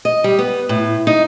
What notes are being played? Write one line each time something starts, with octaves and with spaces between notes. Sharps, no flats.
D#5
G3
B3
A2
D#4